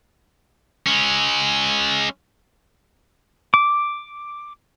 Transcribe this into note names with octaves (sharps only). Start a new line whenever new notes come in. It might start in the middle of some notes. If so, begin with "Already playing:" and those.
G#3 C#4
D6